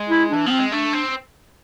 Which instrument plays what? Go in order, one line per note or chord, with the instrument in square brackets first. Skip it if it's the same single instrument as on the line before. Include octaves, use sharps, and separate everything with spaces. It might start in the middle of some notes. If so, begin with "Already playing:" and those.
Already playing: [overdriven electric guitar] G#3
[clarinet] E4
[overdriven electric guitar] E3 [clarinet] D4
[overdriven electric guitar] F3 [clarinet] B3
[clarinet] C4
[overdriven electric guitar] G#3
[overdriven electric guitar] A3 [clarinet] D4
[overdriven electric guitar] C4